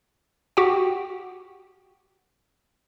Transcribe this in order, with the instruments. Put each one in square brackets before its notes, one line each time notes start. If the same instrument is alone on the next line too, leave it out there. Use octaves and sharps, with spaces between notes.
[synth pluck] F#4 G4 F#5 G5